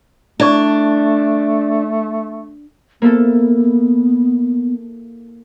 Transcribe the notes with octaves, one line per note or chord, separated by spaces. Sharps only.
A3 D4 E4 D5 C#6
A#3 B3 E4 A4